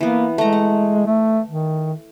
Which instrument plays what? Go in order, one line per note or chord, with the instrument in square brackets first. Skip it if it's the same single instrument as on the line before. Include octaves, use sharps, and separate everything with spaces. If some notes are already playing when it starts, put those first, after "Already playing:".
[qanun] E3 B3 [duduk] A#3
[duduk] G#3 [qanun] A3 A#5
[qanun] F#5
[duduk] A3
D#3